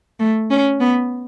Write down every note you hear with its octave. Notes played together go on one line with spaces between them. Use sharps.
A3
C#4
B3